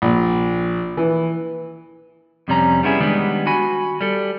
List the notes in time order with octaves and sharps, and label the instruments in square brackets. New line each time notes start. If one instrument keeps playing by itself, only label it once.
[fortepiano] A#1
E3
[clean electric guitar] F2 C3 G3 C#4 A#5
G3 B3 C#4 E4 G#4
D#3 G3 G#3 B3 D4
F#4 G#5 B5
G3 A4